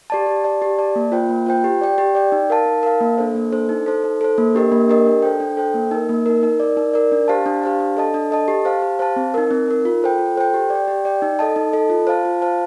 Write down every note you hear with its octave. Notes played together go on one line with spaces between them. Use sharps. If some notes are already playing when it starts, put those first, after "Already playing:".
G4 D5 A5
G4
D5 A5
G4
D5 A5
A#3
F4 C5 G5
A#3
F4 C5 G5
G4
D5 G5
G4
D5 G5
D#4
A#4 F5 A5
D#4
A#4 F5 A5
A#3
D4 A4 C5
A#3
D4 A4 C5
D#4
A4 C5
D#4
A4 C5
A#3
D4 G4 A#4 D#5
A#3
D4 G4 A#4 D#5
D4
A4 C5 G5
D4
A4 C5 G5
A#3
D#4 A#4
A#3
D#4 A#4
D#4
A#4 D5
D#4
A#4 D5
D4
G4 C5 F5 A5
D4
G4 C5 F5 A5
D4
A4 D#5 A5
D4
A4 D#5 A5
G4
C5 F5 A5
G4
C5 F5 A5
C4
D#4 A#4
C4
D#4 A#4
F4
A4 C5 G5
F4
A4 C5 G5
G4
D5
G5
G4
D5 G5
D#4
A4 D#5 A5
D#4
A4 D#5 A5
F4
C5 F5 A5
F4
C5 F5 A5